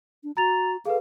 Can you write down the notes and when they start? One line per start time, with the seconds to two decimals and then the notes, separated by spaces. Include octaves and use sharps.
0.24 D4
0.37 F#4 A#5 A6 F7
0.85 G#4 A4 B4 F5